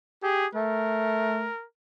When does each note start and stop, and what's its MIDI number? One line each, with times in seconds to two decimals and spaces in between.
0.23 0.46 67
0.23 0.46 68
0.55 1.48 57
0.55 1.65 70